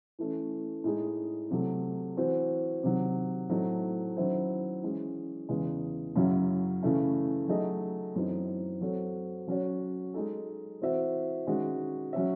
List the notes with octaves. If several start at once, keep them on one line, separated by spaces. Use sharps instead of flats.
E3 A3 C#4
A2 G#3 D#4 G#4
C3 F#3 A3
E3 C4 F#4 C5
C3 D#3 F#3
A2 F#3 A3 C4 D#4
D#3 F#3 C#4 E4 C5
E3 G#3 C#4
E2 C#3 E3 G#3
F#2 C#3 F#3 C#4 E4
C#3 E3 A3 C#4 E4
F#3 A3 D#4 G#4 D#5
F#2 E3 C4 D#4
F#3 C4 F#4 A4 C#5
F#3 C#4 F#4 C#5
G#3 D#4 A4
E3 C4 F#4 C5 E5
D#3 G#3 C#4 F#4
F#3 C#4 F#4 C#5 E5